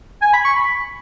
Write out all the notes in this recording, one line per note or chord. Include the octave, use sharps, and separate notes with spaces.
G#5
B5
C#6
B5